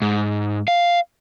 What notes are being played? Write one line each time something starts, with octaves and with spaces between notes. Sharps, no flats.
G#2
F5